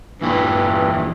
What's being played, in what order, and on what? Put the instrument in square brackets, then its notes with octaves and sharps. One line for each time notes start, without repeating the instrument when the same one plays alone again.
[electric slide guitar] E2 A#2 E4 [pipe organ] G2 E3